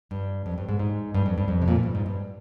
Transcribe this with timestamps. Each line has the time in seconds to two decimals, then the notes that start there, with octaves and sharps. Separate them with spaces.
0.11 G2
0.46 F2
0.58 G2
0.69 G#2
0.79 G#2
1.14 G2
1.26 F2
1.38 G2
1.48 F2
1.62 C3
1.68 A#2
1.76 G#2
1.83 G2
1.95 G#2
2.06 G2